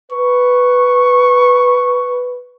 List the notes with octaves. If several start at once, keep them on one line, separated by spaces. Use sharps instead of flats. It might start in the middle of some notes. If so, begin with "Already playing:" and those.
B4 C#6